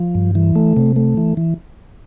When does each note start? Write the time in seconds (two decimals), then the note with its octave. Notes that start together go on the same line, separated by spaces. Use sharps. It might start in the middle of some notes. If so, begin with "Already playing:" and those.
Already playing: F3
0.15 G2
0.35 E3
0.56 A3
0.77 C3
0.96 A3
1.17 E3
1.37 E3